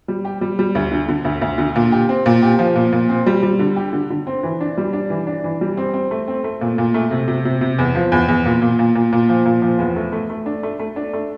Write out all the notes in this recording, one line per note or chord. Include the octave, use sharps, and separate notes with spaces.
G3
G4
G3
G3
D2
D3
D3
D2
D2
D3
A#2
G4
C4
A#2
G4
F3
A#2
A#2
C4
G3
G3
D3
G4
D3
D3
C4
E3
D4
G3
D4
E3
D4
E3
G3
C4
C4
A3
C4
A3
A#2
A#2
A3
C3
C3
C3
C3
E2
F3
E2
E2
A#2
A#2
A#2
A#2
A#2
F3
A#2
F3
E2
A3
A3
A3
D4
A3
A3
D4
A3